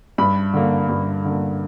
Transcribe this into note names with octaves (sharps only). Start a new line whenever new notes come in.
G2 B5
D3 A#3
G2
D3 A#3